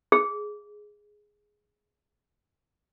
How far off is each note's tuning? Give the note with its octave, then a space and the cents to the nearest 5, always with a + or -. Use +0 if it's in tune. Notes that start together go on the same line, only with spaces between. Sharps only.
G#4 +5